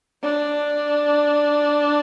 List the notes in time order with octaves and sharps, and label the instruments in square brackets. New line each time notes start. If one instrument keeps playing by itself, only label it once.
[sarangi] D4